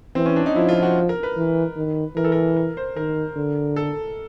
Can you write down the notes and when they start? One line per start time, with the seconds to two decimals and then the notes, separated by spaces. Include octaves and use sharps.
0.15 E3 C4
0.26 C#4
0.36 D4
0.46 D#4
0.56 F3 E4
0.69 F4
0.83 F#4
1.09 A#4
1.23 B4
1.37 E3
1.76 D#3
2.16 E3 A#4
2.24 A4
2.32 A#4
2.57 A#4
2.77 C5
2.97 D#3 A#4
3.36 D3
3.76 A4